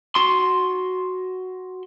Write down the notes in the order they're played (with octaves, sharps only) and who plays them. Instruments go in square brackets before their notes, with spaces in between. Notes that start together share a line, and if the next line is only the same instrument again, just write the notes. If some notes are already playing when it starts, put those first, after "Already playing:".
[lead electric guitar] F#4 C6